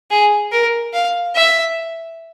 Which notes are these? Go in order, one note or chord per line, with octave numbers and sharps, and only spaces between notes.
G#4
A#4
F5
E5